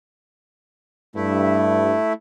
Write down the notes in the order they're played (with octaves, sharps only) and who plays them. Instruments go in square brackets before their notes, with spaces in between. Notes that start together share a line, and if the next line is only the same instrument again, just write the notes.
[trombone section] G2 [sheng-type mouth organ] A3 E4